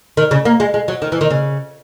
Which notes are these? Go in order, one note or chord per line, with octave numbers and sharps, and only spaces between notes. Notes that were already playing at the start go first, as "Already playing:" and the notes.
D#3
C#3
A#3
G#3
G#3
F#3
D#3
E3
D#3
C#3